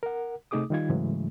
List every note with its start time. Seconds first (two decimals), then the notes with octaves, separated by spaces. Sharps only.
0.03 A#4 F#5
0.51 C3 A3 D#4 G#4 D6 D#6
0.70 D#3 G3 D#4 F4 G#6
0.89 G#2 C#3 E3 F#3 G#3 A3